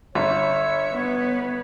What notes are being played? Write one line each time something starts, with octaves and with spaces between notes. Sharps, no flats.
G1 C#5 E5
B3 B4